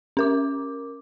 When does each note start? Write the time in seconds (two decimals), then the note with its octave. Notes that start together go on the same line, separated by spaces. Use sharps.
0.17 C#4 A#4 D6